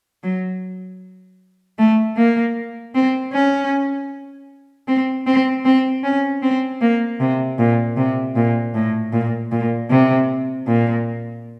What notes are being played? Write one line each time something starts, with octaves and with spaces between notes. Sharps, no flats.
F#3
A3
A#3
C4
C#4
C4
C4
C4
C#4
C4
A#3
C3
A#2
C3
A#2
A2
A#2
A#2
C3
A#2